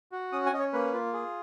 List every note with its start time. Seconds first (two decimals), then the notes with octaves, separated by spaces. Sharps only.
0.12 F#4
0.32 C#4 D#6
0.46 G#5
0.53 C#4 D#5
0.59 C#5
0.73 A#3 B4
0.93 F4
1.13 G#4